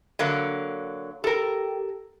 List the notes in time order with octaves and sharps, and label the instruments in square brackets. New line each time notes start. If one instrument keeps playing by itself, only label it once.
[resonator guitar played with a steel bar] D3 F#3 A#3
[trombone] G4 [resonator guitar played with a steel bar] A4 A#4